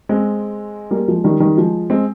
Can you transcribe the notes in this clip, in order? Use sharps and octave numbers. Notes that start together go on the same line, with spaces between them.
G#3 C4
G3 A#3
F3 G#3
D#3 G3
D#3 G3
F3 G#3
G#3 C4